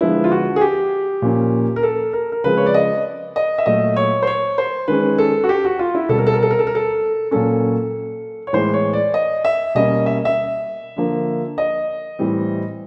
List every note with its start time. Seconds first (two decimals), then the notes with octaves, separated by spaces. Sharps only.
0.01 D3 F3 G#3 B3 E4
0.24 F4
0.32 F#4
0.56 G#4
0.61 G4
1.22 A#2 F3 A#3 C#4
1.76 A#4
1.83 A4
2.13 A#4
2.32 A#4
2.44 C#3 F3 G#3 C4 B4
2.57 C#5
2.66 D5
2.74 D#5
3.36 D#5
3.58 E5
3.66 A#2 F#3 A3 D#5
3.96 C#5
4.22 C5
4.27 C#5
4.58 C5
4.88 D#3 G#3 C#4 B4
5.18 A4
5.44 F#4
5.49 G4
5.65 F#4
5.79 F4
5.95 E4
6.09 B2 G3 C4 A4
6.18 A#4
6.27 A4
6.34 A#4
6.43 A4
6.51 A#4
6.59 A4
6.67 A#4
6.75 A4
7.31 A#2 F#3 A#3 C#4 A4
8.47 C#5
8.53 A2 E3 G#3 B3 C5
8.74 C#5
8.93 D5
9.14 D#5
9.45 E5
9.75 B2 G3 A#3 C#4 D#5
10.06 E5
10.25 E5
10.96 D3 F3 A#3
11.58 D#5
12.19 A2 E3 G3 C4